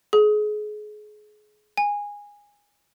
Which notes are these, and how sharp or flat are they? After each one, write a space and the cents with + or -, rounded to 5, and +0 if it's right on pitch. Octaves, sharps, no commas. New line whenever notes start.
G#4 +30
G#5 -15